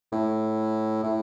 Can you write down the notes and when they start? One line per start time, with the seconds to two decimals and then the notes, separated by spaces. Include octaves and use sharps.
0.12 A2
1.03 A2